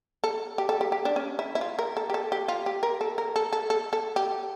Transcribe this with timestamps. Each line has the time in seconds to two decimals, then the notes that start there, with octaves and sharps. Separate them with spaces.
0.24 A4
0.58 G4
0.69 A4
0.81 G4
0.92 G4
1.05 D4
1.16 C#4
1.39 E4
1.55 E4
1.61 F4
1.79 A#4
1.97 A4
2.10 G4
2.14 A4
2.32 G4
2.48 F4
2.66 G4
2.83 A#4
3.01 A4
3.18 A#4
3.36 A4
3.53 A4
3.70 A4
3.93 A4
4.16 G4